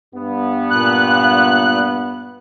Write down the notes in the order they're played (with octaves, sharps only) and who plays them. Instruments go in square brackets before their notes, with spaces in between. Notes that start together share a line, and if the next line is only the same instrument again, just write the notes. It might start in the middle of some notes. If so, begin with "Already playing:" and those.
[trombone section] G2 B3
[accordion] A#2 F#6